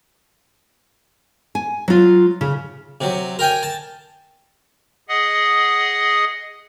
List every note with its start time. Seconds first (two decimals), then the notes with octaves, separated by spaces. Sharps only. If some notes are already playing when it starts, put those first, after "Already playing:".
1.55 G#5
1.88 F#3 F4
2.41 C#3
3.01 C3 F#3
3.39 A#4 G5 G#5
3.63 A5
5.09 G#4 D#5 F#5 D#6